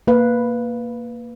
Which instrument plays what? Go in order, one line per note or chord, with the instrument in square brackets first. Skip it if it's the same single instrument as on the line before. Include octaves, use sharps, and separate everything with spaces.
[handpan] A#3 B4 F5